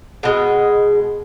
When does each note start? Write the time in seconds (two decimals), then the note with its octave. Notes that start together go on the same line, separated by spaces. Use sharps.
0.23 B2 G#3